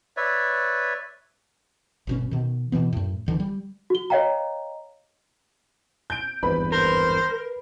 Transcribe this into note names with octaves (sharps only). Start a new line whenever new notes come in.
B4 C#5 D5 E5
G1 B2 C#4
B2 D#3
B2 D#3 E3 B3
F#2 A2
D1 D3 E3
G3
F#4 G7
C#5 D#5 F5 G5 A#5
G6 D7
G#1 E2 G2 B4 B5
A#4 C5